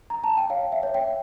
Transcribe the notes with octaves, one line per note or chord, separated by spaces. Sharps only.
A#5
A5
G5
C#5 F5
E5
C#5
G5